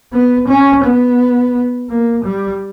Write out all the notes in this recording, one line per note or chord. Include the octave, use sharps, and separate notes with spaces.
B3
C#4
B3
A#3
G3